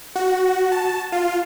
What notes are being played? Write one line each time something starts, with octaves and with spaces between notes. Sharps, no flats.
F#4
A5
F4